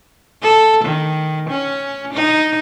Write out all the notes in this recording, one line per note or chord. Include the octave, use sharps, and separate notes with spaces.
A4
D#3
C#4
D#4